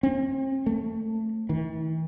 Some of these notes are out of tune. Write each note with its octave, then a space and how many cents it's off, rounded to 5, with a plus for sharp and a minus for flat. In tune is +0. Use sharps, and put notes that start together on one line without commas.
C4 +40
A3 +10
E3 -45